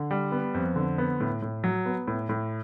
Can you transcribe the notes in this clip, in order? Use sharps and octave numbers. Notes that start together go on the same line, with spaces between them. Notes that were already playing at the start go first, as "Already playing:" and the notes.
Already playing: D3
G3
B3
F2
D3
B3
A2
A2
F#3
B3
A2
A2